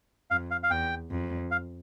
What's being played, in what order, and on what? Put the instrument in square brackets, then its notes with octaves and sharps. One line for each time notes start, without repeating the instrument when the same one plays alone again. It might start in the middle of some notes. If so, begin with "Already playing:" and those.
[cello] F2 [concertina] F5
[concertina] F5
F5
[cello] E2 [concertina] G5
[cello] F2
[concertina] F5